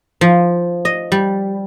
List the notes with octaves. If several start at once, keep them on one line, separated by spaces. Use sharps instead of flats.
F3
D#5
G3